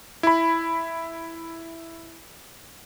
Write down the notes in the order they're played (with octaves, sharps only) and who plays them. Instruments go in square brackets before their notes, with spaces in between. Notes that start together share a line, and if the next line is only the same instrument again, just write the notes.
[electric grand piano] E4 B5